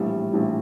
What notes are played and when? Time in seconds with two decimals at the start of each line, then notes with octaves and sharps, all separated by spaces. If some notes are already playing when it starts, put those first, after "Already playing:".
Already playing: A#1 A2 E3 G3
0.33 A#1 A2 E3 G3